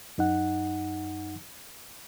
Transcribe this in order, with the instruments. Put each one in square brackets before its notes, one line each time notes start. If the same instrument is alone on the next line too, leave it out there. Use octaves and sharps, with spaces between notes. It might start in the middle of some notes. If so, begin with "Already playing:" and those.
[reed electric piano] F#2 D#4 F#5